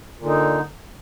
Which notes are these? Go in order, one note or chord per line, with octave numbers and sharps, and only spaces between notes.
A#2 D3 D#4